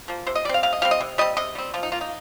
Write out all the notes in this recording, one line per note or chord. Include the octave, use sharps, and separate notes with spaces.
F3 A#3
C3 C5
D#5
G3 C4 D5 F5
C3 F5
D#5
G3 C4 F5
D#5
C3
G3 C4 D#5
C3 D#5
G3 C4
F3 F4
D#4
A#3 F4
D#4